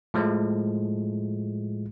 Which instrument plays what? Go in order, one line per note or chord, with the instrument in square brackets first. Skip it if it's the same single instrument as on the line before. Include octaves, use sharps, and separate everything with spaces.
[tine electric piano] A2 F3 G#3 A3